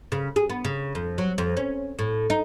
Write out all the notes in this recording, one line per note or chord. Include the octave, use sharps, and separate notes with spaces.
C#3
G#4
B3
C#3
F2
F#3
F2
C#4
A2
D#4